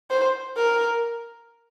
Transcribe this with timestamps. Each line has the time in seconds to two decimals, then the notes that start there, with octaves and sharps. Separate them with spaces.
0.11 C5
0.56 A#4